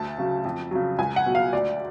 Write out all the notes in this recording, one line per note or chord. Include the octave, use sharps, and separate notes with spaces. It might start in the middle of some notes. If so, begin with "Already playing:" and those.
Already playing: D2 A5
C#3 F#3
F2
C#3 F#3
C#2 G#5
F#5
B2 F#3
F5
D2 D5